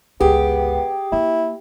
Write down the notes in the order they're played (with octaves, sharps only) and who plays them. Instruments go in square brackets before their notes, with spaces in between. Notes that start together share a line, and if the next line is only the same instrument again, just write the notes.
[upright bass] G1 C#2 [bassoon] B3 [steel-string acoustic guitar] G4 [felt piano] G#4
[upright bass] A#3 [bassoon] E4